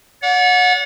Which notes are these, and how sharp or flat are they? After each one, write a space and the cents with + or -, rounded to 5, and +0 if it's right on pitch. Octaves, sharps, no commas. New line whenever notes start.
D5 -40 F#5 -30